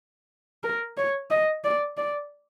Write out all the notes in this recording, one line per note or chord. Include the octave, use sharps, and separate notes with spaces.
A#4
C#5
D#5
D5
D5